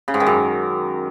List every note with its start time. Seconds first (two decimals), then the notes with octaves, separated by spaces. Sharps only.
0.08 C#3
0.14 G#2
0.20 D#3
0.26 F#2